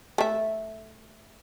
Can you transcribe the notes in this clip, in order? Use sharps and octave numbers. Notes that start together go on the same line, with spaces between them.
A3 E5